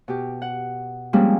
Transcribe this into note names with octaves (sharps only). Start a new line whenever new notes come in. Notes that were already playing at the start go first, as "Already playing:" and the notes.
B2 G4
F#5
F3 G3 G#3 A#3 C4 C#4